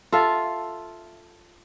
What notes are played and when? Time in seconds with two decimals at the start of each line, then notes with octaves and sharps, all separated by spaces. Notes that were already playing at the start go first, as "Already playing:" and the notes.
0.12 F4 A4 E5 F5